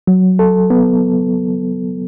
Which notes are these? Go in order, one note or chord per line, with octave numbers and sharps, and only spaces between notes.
F#3
A4
B3